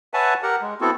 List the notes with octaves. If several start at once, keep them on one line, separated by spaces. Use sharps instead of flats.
B4 C#5 E5 F#5 G#5 A5
G4 A#4 F#5
G#3
B3 C4 E4 F#4 A4